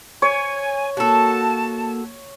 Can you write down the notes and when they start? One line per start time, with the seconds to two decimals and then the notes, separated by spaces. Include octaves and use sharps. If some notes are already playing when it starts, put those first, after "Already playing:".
0.22 C#5 G#5
0.97 A#3 F#4 A4 A5